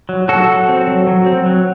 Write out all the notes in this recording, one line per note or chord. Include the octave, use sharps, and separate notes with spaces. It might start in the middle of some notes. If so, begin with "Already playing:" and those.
F#3
F#3 F#4 A4
F#3
C4
F#3
F#3
C4
F#3